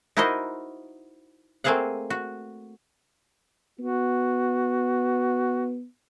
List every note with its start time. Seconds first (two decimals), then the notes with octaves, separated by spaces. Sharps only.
0.17 D#4 E4 F#4 A#4 C5 D#5
1.64 A3 A#3 C4 G#4 F5 F#5
2.10 F#4
3.79 B3 F#4